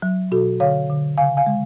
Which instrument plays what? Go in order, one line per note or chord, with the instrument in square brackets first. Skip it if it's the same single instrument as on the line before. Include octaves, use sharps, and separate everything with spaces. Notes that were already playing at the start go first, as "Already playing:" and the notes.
[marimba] F#3
B2 F#4 A4
D3 C#5 F5
D3
C#3 F5 G#5
F5 G#5
G#3